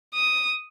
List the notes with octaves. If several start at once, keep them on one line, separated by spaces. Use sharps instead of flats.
D#6